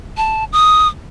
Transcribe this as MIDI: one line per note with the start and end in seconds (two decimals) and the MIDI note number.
0.17 0.44 81
0.53 0.88 87